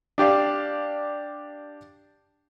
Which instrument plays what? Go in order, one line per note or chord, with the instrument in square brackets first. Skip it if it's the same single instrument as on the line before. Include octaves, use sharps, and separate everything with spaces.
[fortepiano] D4 G4 D5 F5